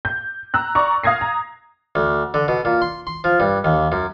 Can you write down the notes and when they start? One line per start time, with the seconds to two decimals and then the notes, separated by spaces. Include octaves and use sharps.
0.05 G6
0.54 A#5 E6 F#6
0.75 D5 A#5 C#6
1.03 F5 D#6 G#6 A#6 C7
1.21 A#5
1.95 D2
2.34 D3
2.48 B2
2.65 A#2
2.82 C6
3.07 C6
3.24 F3
3.40 G2
3.64 D#2
3.92 F#2